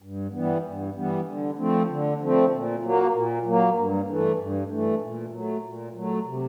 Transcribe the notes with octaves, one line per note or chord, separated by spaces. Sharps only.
G2
E3 G3 B3
G2
E3 G3 B3
D3
F3 A3 C4
D3
F3 A3 C4
A#2
F#3 A#3
A#2
F#3 A#3
G2
E3 A3
G2
E3 A3
A#2
F#3 A3
A#2
F#3 A3
C3